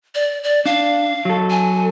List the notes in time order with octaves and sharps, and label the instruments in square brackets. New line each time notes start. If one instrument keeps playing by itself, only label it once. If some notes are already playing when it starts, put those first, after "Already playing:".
[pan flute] D5
D5
[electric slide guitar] D4 [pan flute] F5
[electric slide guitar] F#3 A4
[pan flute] G#5